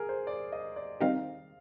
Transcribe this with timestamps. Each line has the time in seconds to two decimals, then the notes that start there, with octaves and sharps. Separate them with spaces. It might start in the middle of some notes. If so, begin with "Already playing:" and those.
Already playing: G#4 A#4
0.09 C5
0.27 D5
0.52 D#5
0.76 D5
1.01 D#3 G3 C4 D#4 G4 F5